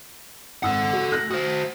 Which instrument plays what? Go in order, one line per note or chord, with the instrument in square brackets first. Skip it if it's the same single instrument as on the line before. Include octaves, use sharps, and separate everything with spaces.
[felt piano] G#1 D#6 E6 [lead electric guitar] A4 F#5
[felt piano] F#4
A3 F#6 A#6
[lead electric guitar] F#4 C5 [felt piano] D#6